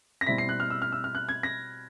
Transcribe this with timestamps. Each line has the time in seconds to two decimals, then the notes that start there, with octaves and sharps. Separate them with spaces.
0.21 A#6
0.27 B2 G3 C4 E4 B6
0.38 C7
0.49 F#6
0.60 F6
0.70 E6
0.82 F6
0.92 E6
1.04 F6
1.15 F#6
1.29 G#6
1.43 A#6